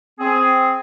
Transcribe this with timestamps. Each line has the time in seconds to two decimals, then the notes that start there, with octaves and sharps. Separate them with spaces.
0.20 C4 G#4